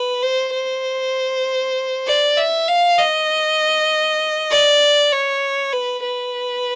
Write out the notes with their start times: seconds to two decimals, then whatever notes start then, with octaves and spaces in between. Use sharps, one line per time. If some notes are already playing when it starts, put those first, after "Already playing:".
Already playing: B4
0.22 C5
0.54 C5
2.07 D5
2.37 E5
2.68 F5
2.98 D#5
4.51 D5
5.12 C#5
5.73 B4
6.03 B4